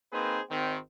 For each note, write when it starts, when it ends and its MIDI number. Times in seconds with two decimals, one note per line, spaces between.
0.13 0.40 58
0.13 0.40 60
0.13 0.40 63
0.13 0.40 68
0.13 0.40 71
0.13 0.40 72
0.50 0.76 32
0.50 0.76 51
0.50 0.76 60